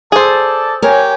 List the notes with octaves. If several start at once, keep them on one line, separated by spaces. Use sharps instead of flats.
G#4 A4 C5 D5 A5
G4 A#4 C#5 G#5